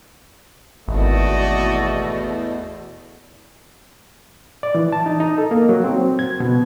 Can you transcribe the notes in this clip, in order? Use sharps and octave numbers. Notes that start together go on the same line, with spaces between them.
G#1 E2 B2 A3 F#4 D5 D#5
D5
E3
A5
D#4
D#4
A4
A#3
F#3
C4
G#6
B2